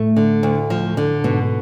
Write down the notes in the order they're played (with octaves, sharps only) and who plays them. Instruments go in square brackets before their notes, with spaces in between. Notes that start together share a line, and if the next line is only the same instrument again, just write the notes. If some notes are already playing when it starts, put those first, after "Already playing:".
Already playing: [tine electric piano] A2 [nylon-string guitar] A3
[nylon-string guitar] D3
D2
F3
D3
[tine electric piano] G#2 [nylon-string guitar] B2